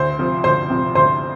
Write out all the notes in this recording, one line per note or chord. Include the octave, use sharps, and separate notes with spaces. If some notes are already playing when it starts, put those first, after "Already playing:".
Already playing: D2 C5 C6
C3 F3
D2 C5 C6
C3 F3
D2 C5 C6